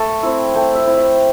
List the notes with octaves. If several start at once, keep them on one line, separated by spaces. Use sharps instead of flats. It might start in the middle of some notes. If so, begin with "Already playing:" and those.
Already playing: A3 A5
C4 E4
A3 G5
E5
C4 E4
E5